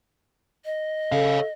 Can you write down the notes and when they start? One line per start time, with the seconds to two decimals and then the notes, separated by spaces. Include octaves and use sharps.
0.65 D#5
1.12 C#3 A4 C#5 F5